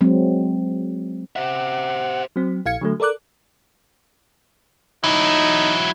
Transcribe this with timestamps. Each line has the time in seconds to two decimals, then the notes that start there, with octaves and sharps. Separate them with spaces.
0.01 F#3 G#3 C4
1.36 C5 E5 F#5
2.36 F#3 C4
2.66 A#1 F5 G#6 C#7
2.81 D3 F#3 A3
3.00 A4 A#4 D5 D6 F#6
5.04 F#3 D#4 E4